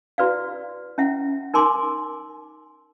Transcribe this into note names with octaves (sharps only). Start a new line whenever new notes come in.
E4 F#4 B4 D5 F5
C#4 E4 E5 F#5
D#4 A#4 G#5 C6 D6